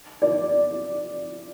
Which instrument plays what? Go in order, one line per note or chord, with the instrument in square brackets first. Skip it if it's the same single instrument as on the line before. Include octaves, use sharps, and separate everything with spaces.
[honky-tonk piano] D5